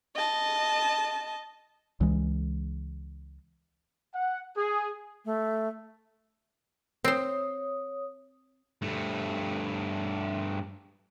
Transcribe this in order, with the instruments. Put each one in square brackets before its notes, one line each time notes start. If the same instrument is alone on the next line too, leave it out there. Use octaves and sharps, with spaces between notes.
[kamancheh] D#5 A5
[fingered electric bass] C#2 E3 G#3
[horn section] F#5
G#4
[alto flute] A3
[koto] C4 C5 [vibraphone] C#5 D#6
[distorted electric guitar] G2 A3